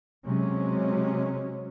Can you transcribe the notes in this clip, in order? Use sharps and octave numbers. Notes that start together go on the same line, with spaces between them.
C3 F#3 G#3 C#4